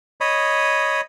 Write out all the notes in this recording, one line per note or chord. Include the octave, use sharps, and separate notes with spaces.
C#5 D#5 B5 D#6